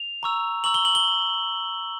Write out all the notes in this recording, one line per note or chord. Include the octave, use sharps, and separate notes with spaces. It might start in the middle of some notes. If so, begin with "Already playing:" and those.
Already playing: F7
A#5 C#6 E6
A#5 C#6 E6 F#7
G7
F#7
G7